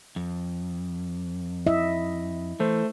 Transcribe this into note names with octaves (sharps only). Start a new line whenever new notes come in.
F2
E4 D#5 E5
E3 A3 C5